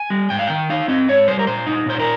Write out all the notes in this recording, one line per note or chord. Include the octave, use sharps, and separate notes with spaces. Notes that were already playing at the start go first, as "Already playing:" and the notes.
Already playing: G#5
G3
G#2 G5
F5
D#3 G5
D#4 F5
C4 D#5
G#2 C#5
G3 C5
A#4
A#2 C5
D#4
A#2 C5
A#4